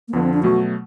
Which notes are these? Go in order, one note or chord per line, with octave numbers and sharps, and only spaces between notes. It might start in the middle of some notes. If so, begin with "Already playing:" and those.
A#3
F2 D3 F3 B3
C4
D4
B2 F#3 A3 F#4